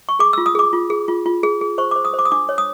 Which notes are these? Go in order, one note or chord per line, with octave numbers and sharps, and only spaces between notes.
C#6
G#4 D6
F4 E6
D#6
G#4 D6
F4
G#4
F4
F4
G#4
G#4
C5 C#6
C5 D6
D#6
C5
D6
D#6
D4 D6
C#5
D#6